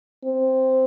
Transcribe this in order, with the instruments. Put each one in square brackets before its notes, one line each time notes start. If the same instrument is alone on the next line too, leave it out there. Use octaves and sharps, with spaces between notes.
[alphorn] C4